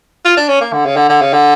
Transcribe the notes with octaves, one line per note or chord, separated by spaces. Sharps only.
F4
D4
C#4
A#3
D3
C#3
D3
D3
C#3
D3